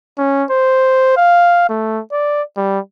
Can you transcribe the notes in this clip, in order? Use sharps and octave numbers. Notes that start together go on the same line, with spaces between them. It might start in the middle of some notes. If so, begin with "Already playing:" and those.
C#4
C5
F5
A3
D5
G3